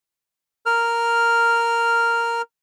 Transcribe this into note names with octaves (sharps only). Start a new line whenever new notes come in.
A#4 F6